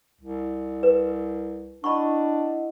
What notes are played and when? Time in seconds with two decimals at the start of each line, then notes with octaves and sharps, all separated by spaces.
0.21 C2
0.83 B4
1.84 D4 E4 D#5 F#5 B5 C#6